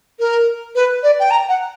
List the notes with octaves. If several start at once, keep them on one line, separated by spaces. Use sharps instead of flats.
A#4
B4
D5
G5
A#5
F#5